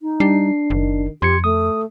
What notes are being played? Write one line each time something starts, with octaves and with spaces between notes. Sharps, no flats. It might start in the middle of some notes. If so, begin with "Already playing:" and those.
D#4
G3 D4 C7
F#1 D#3
F2 G4 C6 G#6 C#7
A3 D#6